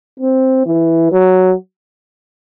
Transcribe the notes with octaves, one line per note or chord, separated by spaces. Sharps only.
C4
E3
F#3